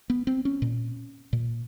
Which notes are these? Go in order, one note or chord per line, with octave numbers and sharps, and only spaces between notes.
B3
C4
C#4
A#2
A#2